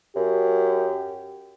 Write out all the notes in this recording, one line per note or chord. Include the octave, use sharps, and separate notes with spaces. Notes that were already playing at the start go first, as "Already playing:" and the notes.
F#2 G4